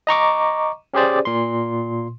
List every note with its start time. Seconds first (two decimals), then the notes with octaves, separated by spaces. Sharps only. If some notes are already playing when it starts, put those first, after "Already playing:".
0.07 D#5 A#5 C#6 D6
0.94 C#4 G4 G#4 C5 D5
1.25 A#2 C6